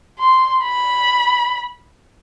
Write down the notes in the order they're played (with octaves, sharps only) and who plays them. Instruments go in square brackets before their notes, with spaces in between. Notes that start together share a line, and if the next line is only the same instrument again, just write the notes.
[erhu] C6
B5